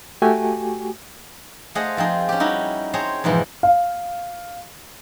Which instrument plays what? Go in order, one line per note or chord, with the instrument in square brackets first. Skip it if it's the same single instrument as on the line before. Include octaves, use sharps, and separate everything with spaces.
[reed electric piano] A3 F#4 G4 G5 G#5
[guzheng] A3 G#4 C5 D#5 F5 F#5
F3 C4 D#4 G#4 A#4
C#4 G4
G3 D#4 E4 F#4
C4 G#4 C5 C#5 A5 A#5
F2 G#2 B2 E3
[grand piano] F5